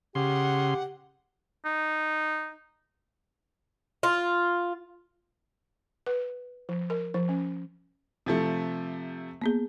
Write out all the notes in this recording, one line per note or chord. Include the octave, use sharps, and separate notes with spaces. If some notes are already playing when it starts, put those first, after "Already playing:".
C#3 G4 F#5 C6
D#4
F4
B4
F3
A#4
F3
C#4
C3 F3 A3
A#3 B3 G#4